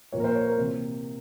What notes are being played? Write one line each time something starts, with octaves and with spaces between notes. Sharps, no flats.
A#2 F3 A#3 C#5
A#4
C5
C#5
A#4
C3 E3 A#3